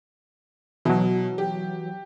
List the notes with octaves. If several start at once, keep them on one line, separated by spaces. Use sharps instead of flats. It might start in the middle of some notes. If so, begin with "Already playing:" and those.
B2 E3 F#3
G4